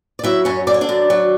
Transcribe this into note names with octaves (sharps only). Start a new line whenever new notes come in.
D5
F#3 E4 E5
F#2 C#4 C#5
D3 D5
C#5
D4 D5
F#2
F#3